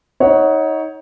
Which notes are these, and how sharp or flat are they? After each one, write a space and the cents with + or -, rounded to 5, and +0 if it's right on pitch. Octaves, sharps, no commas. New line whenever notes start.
D#4 +25 C#5 +0 F#5 +0